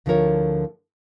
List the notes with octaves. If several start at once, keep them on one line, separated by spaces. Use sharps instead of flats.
D2 D3 F3 E4 A#4 C#5